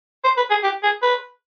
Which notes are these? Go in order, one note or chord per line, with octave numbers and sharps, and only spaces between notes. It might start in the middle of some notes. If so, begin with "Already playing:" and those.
C5
B4
G#4
G4
G#4
B4